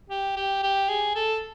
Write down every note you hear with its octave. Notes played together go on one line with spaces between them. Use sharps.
G4
G4
G4
G#4
A4